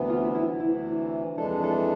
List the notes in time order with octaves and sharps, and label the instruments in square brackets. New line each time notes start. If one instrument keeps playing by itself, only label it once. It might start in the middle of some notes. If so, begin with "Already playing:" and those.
Already playing: [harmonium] D2 C3 E3 B3
[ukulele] F4
E4
[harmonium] D2 C3 E3 [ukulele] E4
[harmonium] F2 E3 G#3 D4 [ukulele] A4
[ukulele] A4